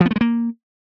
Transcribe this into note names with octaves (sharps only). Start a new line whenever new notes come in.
F3
B3
A3
G#3
A#3